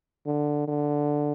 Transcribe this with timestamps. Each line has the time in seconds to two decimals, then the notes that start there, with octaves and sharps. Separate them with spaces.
0.26 D3
0.68 D3